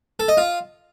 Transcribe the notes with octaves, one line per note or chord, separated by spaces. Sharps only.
A4
D#5
F4